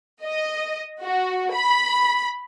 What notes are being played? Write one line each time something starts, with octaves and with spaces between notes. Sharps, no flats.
D#5
F#4
B5